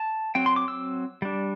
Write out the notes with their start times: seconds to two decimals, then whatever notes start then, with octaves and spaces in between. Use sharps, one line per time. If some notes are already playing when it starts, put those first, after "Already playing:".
Already playing: A5
0.35 F#3 C4 G5
0.46 C6
0.56 D6
0.68 E6
1.22 G3 D4